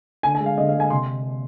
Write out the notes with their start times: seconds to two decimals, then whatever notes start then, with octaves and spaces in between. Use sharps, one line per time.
0.23 D3 G#5
0.35 G#5
0.40 G#3
0.46 F5
0.58 D3 D#5
0.69 F5
0.74 G#3
0.80 G#5
0.90 C3 C6